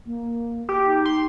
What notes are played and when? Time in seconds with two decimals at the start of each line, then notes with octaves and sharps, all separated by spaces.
0.06 A#3
0.69 G4
0.86 D#4
1.05 C6